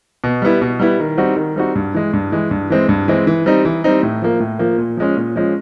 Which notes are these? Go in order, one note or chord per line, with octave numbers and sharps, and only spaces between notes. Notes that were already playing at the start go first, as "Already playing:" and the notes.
B2
G3 B3 E4
B2
G3 B3 E4
D#3
G3 C4 D#4 F#4
D#3
G3 C4 D#4 F#4
G2
E3 G#3
G2
E3 G#3
G2
E3 G#3 C4
G2
E3 G#3 C4
E3
G3 C4 D#4
E3
G3 C4 D#4
A2
F3 A#3
A2
F3 A#3
A#2
F3 G#3 C#4
A#2
F3 G#3 C#4